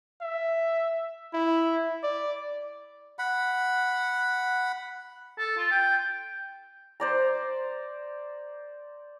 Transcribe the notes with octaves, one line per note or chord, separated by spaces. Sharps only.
E5
E4
D5
F#5 B5
A4
F4
G5
C5 D5 A#5